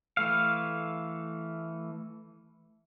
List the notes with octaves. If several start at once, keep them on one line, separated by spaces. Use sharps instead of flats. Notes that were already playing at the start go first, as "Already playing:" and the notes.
E3 A3 F5